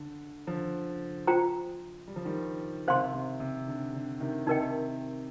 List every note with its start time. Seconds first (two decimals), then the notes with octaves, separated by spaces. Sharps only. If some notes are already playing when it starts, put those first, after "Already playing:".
Already playing: D3
0.47 D3 F3
1.27 F4 C5 G5 A#5
2.07 G3
2.16 F3
2.25 D#3 G3
2.87 C3 D#3 C5 F5 C6
3.14 C3
3.40 C3
3.68 D3
3.94 D3
4.20 C3 D#3
4.47 C3 D#3 D#4 A#4 D#5 G5